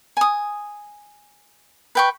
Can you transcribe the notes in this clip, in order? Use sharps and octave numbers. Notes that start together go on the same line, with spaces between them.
G#5 D#6
B4 G5 C#6